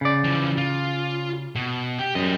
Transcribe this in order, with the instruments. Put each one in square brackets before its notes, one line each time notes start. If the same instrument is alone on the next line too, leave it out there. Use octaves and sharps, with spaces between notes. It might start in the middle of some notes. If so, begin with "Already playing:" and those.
[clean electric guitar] C#3 D5
[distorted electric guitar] E3 F3
F4
B2
G4
[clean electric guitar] F#2 [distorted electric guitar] G3 D#5